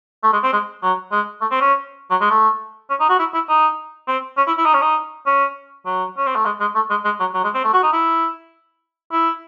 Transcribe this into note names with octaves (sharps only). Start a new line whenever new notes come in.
A3
G#3
C4
G#3
F#3
G#3
A3
C4
C#4
F#3
G#3
A3
C#4
D#4
F#4
E4
E4
D#4
C4
C#4
E4
E4
D#4
C#4
D#4
C#4
F#3
C#4
C4
A3
G#3
G#3
A3
G#3
G#3
F#3
F#3
G#3
C4
A3
F#4
D#4
E4
E4